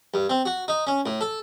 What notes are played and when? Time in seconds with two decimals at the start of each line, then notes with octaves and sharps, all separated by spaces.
0.14 G2
0.30 C4
0.45 F#4
0.68 D#4
0.87 C#4
1.06 A2
1.21 A4